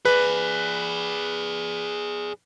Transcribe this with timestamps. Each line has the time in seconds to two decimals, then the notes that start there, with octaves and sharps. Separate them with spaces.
0.05 G#4 B4 D5